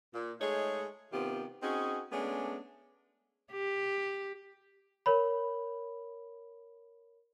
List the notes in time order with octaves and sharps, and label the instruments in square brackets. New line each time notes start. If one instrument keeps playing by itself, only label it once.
[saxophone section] A#2
G#3 A3 D#4 G#4 C#5
C3 D#3 B3 C4 F4 G4
C4 C#4 D#4 F#4 G#4
G#3 A3 B3 C#4 D4
[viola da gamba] G4
[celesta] A#4 C#5 B5